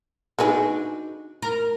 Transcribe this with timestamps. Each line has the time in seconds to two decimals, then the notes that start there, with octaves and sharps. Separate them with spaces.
0.39 D3 B3 D4 D#4 F#4 G#4
1.42 A#4